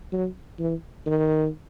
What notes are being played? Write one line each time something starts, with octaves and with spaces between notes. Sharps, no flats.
F#3
E3
D#3